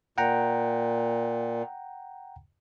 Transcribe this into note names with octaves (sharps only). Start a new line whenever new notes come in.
A#2 F#5 G5 A#5